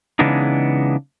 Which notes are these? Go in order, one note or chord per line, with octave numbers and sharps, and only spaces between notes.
C#3 E3 G#3 B3 D4 D#4